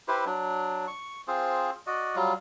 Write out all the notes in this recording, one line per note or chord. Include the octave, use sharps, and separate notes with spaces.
E4 G4 B4 C5
F#3 D4
C#6
C4 F4 G#4 C5
F#4 D5 D#5
F#3 G3 F4